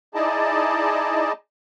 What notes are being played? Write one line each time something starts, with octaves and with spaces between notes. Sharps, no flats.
D#4 E4 G#4 D5 D#5 A5